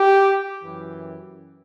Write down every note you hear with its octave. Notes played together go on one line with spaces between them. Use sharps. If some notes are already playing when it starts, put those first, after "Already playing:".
Already playing: G4
F#2 E3